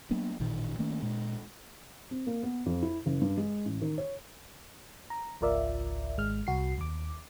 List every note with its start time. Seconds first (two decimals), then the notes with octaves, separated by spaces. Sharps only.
0.11 F#3 A#3 B3 D4
0.40 A1 A#2 D#3
0.79 D#3 A3 A#3 C#4
1.02 A#2 G#3
2.11 C4
2.27 A#3
2.43 B3
2.66 F2
2.82 E4
3.06 F#1
3.21 G2
3.37 G#3
3.65 A1
3.82 D#3
3.98 C#5
5.10 A#5
5.41 G#1 C#2 F4 A#4 D5 E5
6.17 G#1 G#3 F6
6.47 C2 F#4 C7
6.78 D#2 D6